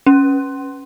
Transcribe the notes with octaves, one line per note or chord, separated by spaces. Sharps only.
C#4